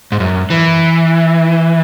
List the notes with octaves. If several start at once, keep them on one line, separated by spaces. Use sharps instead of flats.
G#2
F#2
E3